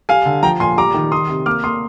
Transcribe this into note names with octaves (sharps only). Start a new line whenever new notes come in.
G3 F5 G#5
D3
F3 G5 A#5
A#2 G#5 C6
G3 A#5 D6
D#3
D#3 C6 D#6
C3
A#3 D6 F6
A#3 C6 D#6